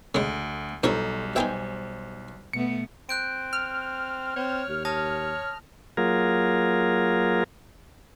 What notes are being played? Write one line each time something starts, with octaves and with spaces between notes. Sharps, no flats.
D2 C#3 G#3
B1 G2 F3 G3 D#4 A4 C#5
D#4 B4 C5 E5 G5 G#5
B2 A3 B3 C#7
C4 F#6 G6 D7
F6
C4 C#5
D#2
C#5 A5 D#6 A#6
F#3 A#3 F4 G#4 A#4